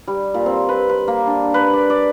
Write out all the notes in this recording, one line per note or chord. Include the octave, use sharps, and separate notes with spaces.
G3
A#2
C4
B4
B4
A#3
D4
B4
D5
D5